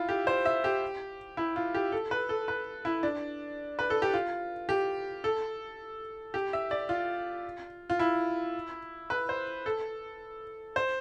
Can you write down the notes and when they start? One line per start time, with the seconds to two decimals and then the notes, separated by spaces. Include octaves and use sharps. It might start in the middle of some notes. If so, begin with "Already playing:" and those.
Already playing: E4 F4
0.09 G4
0.27 C5
0.45 E5
0.64 G4
1.37 E4
1.56 F4
1.74 G4
1.92 A4
2.11 B4
2.29 A4
2.48 B4
2.85 E4
3.03 D4
3.79 B4
3.90 A4
4.02 G4
4.14 F4
4.69 G4
5.24 A4
6.34 G4
6.53 E5
6.71 D5
6.89 F4
7.90 F4
7.99 E4
9.10 B4
9.29 C5
9.66 A4
10.76 C5